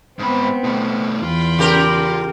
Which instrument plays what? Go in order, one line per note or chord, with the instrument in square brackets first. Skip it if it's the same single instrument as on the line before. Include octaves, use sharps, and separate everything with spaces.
[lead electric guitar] G#2 B5 [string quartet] B3 C4
[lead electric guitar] B2 A3
[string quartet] E2 G5 B5 [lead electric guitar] F4
[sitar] C#3 G4 A#4